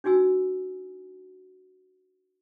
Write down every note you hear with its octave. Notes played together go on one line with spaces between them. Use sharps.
D4 D#4 F#4 G#5 E6